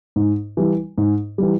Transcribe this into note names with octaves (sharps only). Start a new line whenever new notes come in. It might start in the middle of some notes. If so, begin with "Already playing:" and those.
G#2
E3 G3
G#2
E3 G3